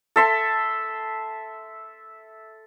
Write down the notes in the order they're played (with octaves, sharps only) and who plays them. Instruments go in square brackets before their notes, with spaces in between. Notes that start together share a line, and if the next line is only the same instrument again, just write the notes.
[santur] A4 E5 C6